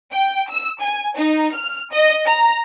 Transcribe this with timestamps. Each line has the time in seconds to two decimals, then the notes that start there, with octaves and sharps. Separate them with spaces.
0.12 G5
0.50 E6
0.81 G#5
1.17 D#4
1.55 F6
1.92 D#5
2.26 A#5